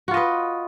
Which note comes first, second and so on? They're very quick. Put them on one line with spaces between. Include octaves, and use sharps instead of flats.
F#4 F4 D#5 B4